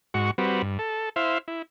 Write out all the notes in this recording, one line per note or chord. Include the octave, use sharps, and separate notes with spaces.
G#2 F#4 C#6
G3 C4 F#4 B4
G2
A4
E4 C5 E5 F5
E4